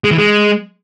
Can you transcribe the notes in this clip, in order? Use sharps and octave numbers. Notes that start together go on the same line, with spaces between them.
G#3
E3
G#3